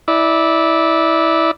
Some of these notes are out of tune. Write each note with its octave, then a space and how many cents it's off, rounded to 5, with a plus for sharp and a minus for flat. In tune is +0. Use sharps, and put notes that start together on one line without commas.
E4 -15 D5 +0